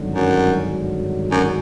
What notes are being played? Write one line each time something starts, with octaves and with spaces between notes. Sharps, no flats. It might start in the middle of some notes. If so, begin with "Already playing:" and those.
Already playing: G#1 G2 D3 F#3
F#2
F#2